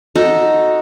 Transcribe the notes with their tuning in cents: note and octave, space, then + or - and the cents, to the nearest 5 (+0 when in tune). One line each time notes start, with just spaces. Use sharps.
D#4 +0 F#4 -15 A4 +0